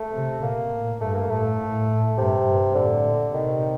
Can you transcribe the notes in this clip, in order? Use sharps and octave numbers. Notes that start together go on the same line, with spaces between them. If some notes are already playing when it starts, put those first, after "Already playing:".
Already playing: A3
C3
A#2 A#3
A2
G2 A3
A#3
A2 A3
A2
G2 C3
G2
A2 D3
A#2
C3 D#3